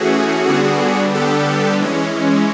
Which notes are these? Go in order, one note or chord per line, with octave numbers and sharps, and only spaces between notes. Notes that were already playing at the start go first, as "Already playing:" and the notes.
Already playing: E3 A3 C#4 F#4 G#4
D3 G3 B3 D4
G4 A4
E3 G#3 C#4